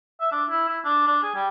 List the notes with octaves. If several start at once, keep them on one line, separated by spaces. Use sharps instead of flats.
E5
D4
E4
E4
D4
D4
G#4
G3